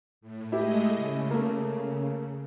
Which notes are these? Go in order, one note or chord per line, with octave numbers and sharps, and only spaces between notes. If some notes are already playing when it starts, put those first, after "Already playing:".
A2
G#3 A3 E4 G4 A4 D#5
C#3
A3 A#3